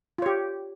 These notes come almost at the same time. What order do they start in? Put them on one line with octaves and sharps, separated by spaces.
F4 C#5 G4